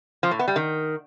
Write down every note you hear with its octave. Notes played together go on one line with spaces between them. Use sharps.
F3
A2
B3
G3
D#3